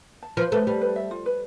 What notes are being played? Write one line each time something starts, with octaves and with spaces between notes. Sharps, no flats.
A5
F3 B4
A3 B4
G3 B4
B4
E5
F4
B4